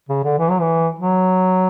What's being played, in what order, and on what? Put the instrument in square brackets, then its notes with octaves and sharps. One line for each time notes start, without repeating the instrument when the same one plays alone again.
[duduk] C#3
D3
E3
F#3
E3
F#3